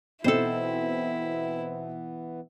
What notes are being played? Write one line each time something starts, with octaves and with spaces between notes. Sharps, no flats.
B2 E3 B3 C4 D#4 E4 A4 C5